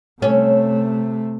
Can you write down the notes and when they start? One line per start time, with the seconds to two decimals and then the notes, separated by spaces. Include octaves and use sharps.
0.22 C3 A3 C#4